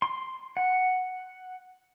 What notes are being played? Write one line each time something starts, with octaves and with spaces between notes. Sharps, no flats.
C6
F#5